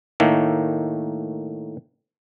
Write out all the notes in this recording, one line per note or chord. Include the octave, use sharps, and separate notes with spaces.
A2 D#3 A3 A#3